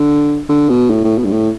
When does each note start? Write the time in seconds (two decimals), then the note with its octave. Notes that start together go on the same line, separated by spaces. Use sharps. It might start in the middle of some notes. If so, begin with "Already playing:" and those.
Already playing: D3
0.49 D3
0.69 B2
0.90 A2
1.04 A2
1.18 B2
1.25 G2
1.31 A2